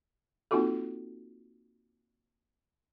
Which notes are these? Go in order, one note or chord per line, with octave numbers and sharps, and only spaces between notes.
A#3 C4 D#4 F4 F#4 A4